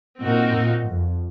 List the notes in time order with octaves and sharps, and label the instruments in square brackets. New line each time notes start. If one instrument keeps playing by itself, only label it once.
[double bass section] A#2 [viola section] C4 D#4 F#4 A#4
[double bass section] A#2
F2